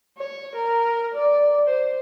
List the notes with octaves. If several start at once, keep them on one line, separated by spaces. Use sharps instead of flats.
C#5
A#4
D5
C5